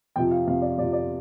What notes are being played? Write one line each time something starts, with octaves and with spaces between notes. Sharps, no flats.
F2 C3 F3 G5
F5
F2 C3 F3 F5
D5
F2 C3 F3 D5
D5